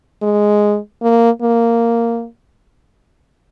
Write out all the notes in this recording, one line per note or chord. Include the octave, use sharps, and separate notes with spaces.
G#3
A#3
A#3